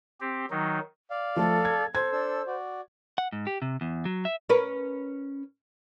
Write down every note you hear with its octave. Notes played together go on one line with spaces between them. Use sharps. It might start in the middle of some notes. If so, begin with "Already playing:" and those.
C4 G4
D#3 F#3 D#4
D5 F5
F3 A3 A4
G#6
A4 C5 G#6
D4 A4 E6
F#4 D5
F#5
G#2
G4
C3
E2
F#3
E5
C#4 A#4 B4